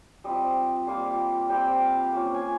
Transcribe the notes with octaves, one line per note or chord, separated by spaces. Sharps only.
G3 C4 F4 D#5
G3 A#3 F4 F5
G3 C4 F4 G5
F5
A#3 C#4 F4
G#5